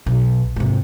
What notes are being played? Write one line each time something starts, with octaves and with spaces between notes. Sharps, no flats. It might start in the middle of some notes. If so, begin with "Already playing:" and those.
B1
G#2 C3